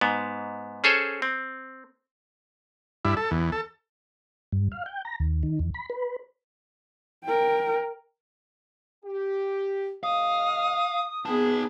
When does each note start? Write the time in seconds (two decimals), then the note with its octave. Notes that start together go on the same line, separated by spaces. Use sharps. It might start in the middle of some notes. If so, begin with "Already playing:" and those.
0.01 G#2 B3
0.84 C#4 G#4 A4 C5 C#5
1.22 C4
3.05 G2 E4
3.17 A4
3.31 E2
3.52 A4
4.53 G2
4.72 F5
4.86 G5
5.05 A#5
5.20 D#2
5.43 D#3
5.59 E2
5.74 B5
5.90 B4
7.24 A#4 G5
9.05 G4
10.03 A2 C3 D#5 F5 D#6
11.26 D#2 B2 B3 D#4 G#4 A5